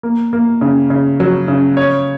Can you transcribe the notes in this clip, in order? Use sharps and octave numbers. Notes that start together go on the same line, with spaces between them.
A#3
A#3
C#3
C#3
F#3
C#3
C#5